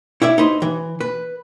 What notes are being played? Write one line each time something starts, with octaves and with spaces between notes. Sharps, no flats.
E4 C#5 D5 E5
D#4 B4 C5
E3
B4